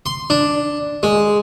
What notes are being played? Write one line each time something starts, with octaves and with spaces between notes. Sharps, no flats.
C6
D4
G#3